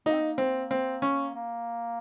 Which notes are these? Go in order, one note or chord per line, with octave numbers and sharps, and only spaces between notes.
A#3 D#4
C4
A#3
C4
C4
C#4
A#3